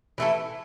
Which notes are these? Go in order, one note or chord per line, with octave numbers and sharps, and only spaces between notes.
E3 A3 E4 A4